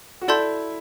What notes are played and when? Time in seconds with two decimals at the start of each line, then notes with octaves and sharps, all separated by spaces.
0.21 F#4
0.28 E4 A4 D5 A5 C6 G6